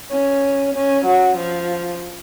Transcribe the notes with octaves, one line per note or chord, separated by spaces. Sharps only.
C#4
C#4
F#3
F3